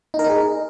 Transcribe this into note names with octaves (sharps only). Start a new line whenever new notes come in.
D#4
A#4
D#4
G#4